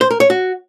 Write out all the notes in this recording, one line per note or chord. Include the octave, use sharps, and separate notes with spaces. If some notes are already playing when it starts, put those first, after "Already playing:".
C5
A#4
C#5
F#4